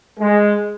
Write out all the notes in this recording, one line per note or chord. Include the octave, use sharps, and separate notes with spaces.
G#3